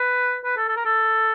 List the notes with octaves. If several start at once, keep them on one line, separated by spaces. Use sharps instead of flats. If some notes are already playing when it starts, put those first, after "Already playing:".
Already playing: B4
B4
A4
A4
A#4
A4